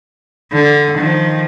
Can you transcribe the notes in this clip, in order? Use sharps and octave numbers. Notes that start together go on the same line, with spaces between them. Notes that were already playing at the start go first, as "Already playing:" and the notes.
D3
D#3 F3